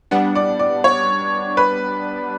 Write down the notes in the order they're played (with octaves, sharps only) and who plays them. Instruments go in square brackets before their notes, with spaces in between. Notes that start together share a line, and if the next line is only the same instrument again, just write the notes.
[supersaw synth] G3 B3 D4 [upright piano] F#5
[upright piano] D5
D5
C#5
B4